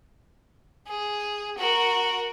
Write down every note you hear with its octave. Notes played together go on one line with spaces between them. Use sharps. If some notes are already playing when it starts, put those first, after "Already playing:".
G#4
F#4 A#4